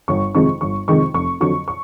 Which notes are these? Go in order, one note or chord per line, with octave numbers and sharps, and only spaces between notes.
G1 C#6
F2 C3 D#3 G#3 C#6
G1 C#6
F2 C3 D#3 G#3 C#6
F1 C#6
F2 D3 F#3 C#6
C#6